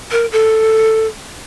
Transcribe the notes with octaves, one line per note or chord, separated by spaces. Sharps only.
A#4
A4